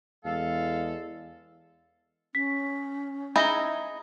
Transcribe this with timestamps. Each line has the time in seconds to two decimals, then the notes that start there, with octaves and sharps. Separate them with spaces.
0.25 E2 G#3 A4 F5
2.35 C#4 B6
3.36 D#4 E4 G#4 B5 A#6 G7